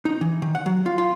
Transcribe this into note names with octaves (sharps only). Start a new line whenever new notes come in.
D#4
E3
D#3
F#5
F#3
F4
F4